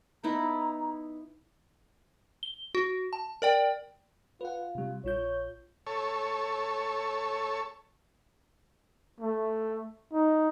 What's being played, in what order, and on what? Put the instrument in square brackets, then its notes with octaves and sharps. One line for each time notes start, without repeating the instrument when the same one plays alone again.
[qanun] B3 D#4 E4 [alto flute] A#5
[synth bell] G7
F#4
A5
A#4 D5 G5
[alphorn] F4 [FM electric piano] B4 F#5
[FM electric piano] C3 G3
[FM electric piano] A#1 F4 G6 [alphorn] C#5
[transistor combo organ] A4 C#5
[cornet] A3
D#4